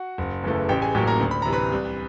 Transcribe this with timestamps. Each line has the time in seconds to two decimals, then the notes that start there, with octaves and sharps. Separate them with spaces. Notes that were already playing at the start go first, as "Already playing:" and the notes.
Already playing: F#4 F#5
0.18 F#1
0.43 E2 C#3 E3 A3
0.69 A1 G4 G5
0.82 G#4 G#5
0.95 A2 F#3 A#3 G4 G5
1.07 A#4 A#5
1.21 D2
1.31 B5
1.42 C3 E3 A#5
1.53 B4 B5
1.72 C2